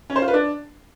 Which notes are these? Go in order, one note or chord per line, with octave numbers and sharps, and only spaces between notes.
C#4
C5
F4
B4
D4